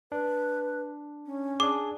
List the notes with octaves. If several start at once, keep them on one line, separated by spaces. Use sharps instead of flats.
D4 B4
C#4
D4 G#4 D6